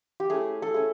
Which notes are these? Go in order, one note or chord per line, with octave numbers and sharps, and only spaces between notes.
G4
A3 C#4 E4 G#4
A4
A3 C#4 E4 G#4